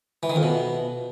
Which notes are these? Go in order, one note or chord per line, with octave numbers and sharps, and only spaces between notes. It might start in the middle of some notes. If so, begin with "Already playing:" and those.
E3
D#3
F2
B2